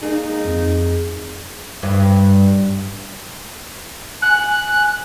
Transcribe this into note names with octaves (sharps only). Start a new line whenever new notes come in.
G#3 A#3 D#4 G#4
F2
G2
G#5 F#6